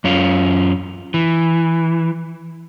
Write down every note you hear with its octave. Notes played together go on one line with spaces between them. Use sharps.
F#2 C#4 F4
E3